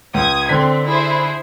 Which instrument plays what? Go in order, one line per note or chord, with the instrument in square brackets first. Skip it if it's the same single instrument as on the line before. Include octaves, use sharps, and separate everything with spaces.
[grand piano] C#2 [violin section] D#6 G#6
[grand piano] D3 B6 [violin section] C4
[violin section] E4 G#4 C5